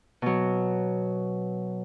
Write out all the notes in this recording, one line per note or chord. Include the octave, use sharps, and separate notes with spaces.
B2 F#3